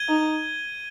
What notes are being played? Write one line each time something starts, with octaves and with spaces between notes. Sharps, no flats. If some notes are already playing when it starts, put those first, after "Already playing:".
Already playing: G#6 D#7 G7
D#4